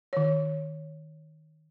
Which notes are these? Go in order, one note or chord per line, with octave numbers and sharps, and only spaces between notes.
D#3 C#5